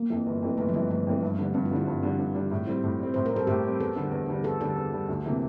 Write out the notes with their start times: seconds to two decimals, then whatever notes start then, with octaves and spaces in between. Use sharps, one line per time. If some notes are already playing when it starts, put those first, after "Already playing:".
Already playing: A#3
0.10 F2 E3
0.26 G1
0.42 F2 E3
0.58 G1 A3
0.69 F3
0.74 F2 E3 G3
0.90 G1 A3
1.07 F2 E3
1.22 G2
1.39 D3 G3 D4
1.54 G2 C4
1.65 F4
1.71 D3 G3 D4 E4
1.87 G2
2.03 D3 G3 D4
2.19 G2
2.35 D3 G3 D4
2.51 A2
2.67 G3 C4 E4
2.84 A2
3.00 G3 C4
3.14 A2 C5
3.26 A#4
3.32 G3 C4 A4
3.47 A2 G4
3.64 G3 C4
3.80 E2 A4
3.96 D3 G3 D4
4.11 E2
4.28 D3 G3 D4
4.44 E2 A4
4.61 D3 G3 D4 A4
4.76 E2
4.92 D3 G3 D4
5.09 D2
5.25 C3 E3 A#3